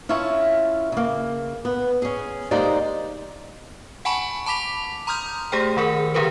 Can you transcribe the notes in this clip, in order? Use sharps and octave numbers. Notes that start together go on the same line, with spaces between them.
C#4 E4 F4 C#5 E5 A5
C#3 A#3
B3
C#4 G#4
G#3 A#3 D#4 G4 C5 D5
F#5 G#5 A5 B5 C#6
A5 B5 D6 B6 F7
A#5 C6 D#6 F6 G6
A3 G4 G#4 C5 G5
D#3 G#4 A#4
D3 E3 G4 G#4 A#4 B4